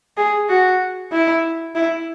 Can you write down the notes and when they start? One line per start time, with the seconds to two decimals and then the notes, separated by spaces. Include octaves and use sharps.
0.17 G#4
0.49 F#4
1.12 E4
1.75 E4